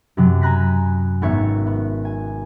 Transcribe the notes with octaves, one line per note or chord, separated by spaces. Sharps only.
F#2 C3 F#3
G#5 A#5 B5 F#6 A#6 B6
G#1 B3 C#5 E5 C#7
B3
G#5